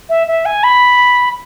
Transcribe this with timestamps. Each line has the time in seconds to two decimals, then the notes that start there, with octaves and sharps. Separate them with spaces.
0.09 E5
0.28 E5
0.46 G#5
0.64 B5